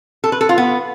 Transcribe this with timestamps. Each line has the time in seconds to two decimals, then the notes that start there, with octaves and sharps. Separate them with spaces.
0.24 A4
0.32 B4
0.41 A4
0.49 F4
0.58 B3